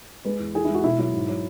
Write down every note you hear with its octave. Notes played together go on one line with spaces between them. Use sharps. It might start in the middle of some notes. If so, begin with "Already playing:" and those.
G#3 B4
E2
E3 G#4
E4
G#3 F#4
B2 E4
F#3 E4
G#2
F#3